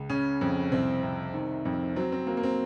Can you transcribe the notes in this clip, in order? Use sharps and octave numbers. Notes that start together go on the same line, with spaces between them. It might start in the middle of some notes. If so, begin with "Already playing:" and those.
Already playing: C#2
C#3 C#4
F2
C2 C4
C3
D#3
F2
F#3 C4
C4
F#3 A#3
A#3
C4